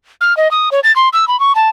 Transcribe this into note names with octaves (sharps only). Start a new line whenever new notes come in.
F6
D#5
D#6
C#5
A6
C6
E6
B5
C#6
A5